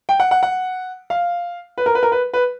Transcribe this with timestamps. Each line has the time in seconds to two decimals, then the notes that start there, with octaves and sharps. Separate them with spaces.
0.09 G5
0.20 F#5
0.31 F#5
0.43 F#5
1.10 F5
1.78 B4
1.86 A#4
1.95 B4
2.03 A#4
2.12 B4
2.33 B4